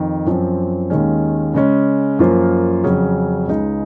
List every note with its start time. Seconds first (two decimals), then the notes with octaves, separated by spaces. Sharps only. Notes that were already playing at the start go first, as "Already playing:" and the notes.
Already playing: F2 D#3
0.26 F#2 F3 C4
0.90 D#2 D#3 G#3 C#4
1.54 C#3 G#3 C#4
2.19 F#2 F3 A#3 F4 C5
2.84 F2 C#3 F#3 C#4 G#4
3.47 C#2 C#3 G#3 D#4